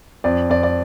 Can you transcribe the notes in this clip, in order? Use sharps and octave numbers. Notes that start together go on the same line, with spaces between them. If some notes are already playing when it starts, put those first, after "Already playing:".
F2 D5
F2 D5
D5